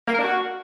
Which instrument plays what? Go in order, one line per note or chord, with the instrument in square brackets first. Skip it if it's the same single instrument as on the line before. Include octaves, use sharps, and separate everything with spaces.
[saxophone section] A#3
A#4
D4
F#4